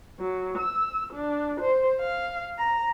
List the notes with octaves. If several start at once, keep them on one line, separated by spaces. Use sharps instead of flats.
F#3
E6
D4
C5
F5
A#5